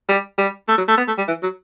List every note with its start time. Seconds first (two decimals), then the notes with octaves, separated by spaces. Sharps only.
0.09 G3
0.38 G3
0.68 A3
0.78 F#3
0.88 A3
0.98 B3
1.08 A3
1.18 G3
1.28 E3
1.43 F#3